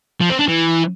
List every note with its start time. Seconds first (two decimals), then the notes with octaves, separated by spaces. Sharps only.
0.21 F3
0.30 C4
0.39 D4
0.48 E3